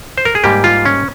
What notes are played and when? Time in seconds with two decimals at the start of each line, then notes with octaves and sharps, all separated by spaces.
0.18 C5
0.25 A#4
0.35 G#4
0.44 G#2 G3 A#3 G4
0.64 F4
0.85 C#4